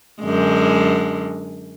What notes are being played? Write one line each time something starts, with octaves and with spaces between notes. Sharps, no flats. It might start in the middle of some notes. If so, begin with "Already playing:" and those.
F#2 D3 G#3